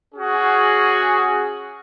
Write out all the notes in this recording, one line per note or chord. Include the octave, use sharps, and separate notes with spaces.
C#4 F#4 G#4